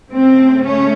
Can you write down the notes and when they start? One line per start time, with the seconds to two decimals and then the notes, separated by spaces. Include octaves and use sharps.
0.11 C#3 A3 C4
0.64 C#4